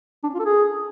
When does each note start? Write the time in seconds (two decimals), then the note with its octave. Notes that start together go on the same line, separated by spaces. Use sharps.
0.24 D4
0.29 C#4
0.34 F4
0.39 A4
0.45 G#4